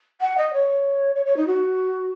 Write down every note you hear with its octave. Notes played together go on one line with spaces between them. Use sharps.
F#5
D#5
C#5
C#5
C#5
D#4
F#4